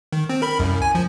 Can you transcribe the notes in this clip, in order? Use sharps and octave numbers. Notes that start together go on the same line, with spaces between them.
D#3
C4
A#4 B5
C2 F#2
G#5
F3